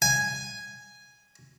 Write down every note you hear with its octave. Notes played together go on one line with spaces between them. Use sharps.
G#5